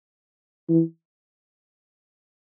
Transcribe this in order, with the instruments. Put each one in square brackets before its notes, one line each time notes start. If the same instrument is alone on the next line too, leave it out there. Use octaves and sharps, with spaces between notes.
[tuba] E3